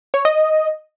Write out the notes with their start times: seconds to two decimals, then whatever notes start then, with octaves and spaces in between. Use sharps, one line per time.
0.14 C#5
0.25 D#5